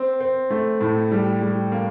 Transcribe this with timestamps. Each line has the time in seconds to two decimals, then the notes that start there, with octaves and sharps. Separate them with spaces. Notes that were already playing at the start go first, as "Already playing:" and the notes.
Already playing: C4
0.21 C4
0.50 A3
0.81 A2
1.12 G3
1.41 G3
1.72 A#3